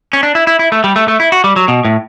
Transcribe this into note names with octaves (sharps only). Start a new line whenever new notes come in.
C#4
D4
E4
E4
E4
A3
G3
A3
A3
E4
F#4
G3
F#3
B2
A2